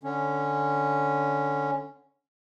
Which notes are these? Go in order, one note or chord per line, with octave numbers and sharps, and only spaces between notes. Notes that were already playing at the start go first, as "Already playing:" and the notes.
D3 C#4